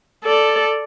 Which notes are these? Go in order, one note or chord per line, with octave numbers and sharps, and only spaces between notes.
A4 D5